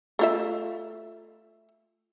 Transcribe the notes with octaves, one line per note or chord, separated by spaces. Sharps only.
A3 F4 E5